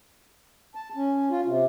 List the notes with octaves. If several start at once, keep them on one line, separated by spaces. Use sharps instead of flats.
A5
C#4
F4
C3